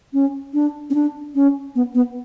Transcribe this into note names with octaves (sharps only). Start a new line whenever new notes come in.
C#4
D4
C#4
D4
C#4
B3
B3